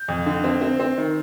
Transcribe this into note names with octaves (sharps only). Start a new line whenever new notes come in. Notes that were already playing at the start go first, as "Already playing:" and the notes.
Already playing: G6
F2
D3
C4
C4
C4
D#3